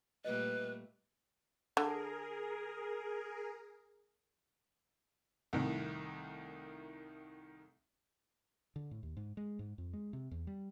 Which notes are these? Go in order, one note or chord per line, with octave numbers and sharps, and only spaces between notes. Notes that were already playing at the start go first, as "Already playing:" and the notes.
A#2 G3 A3 B4 D#5
D3 G#4 A#4
C2 A2 D#3
D3
A2
D#2
G#2
G#3
G#2
F2
G#3
C3
E2
G3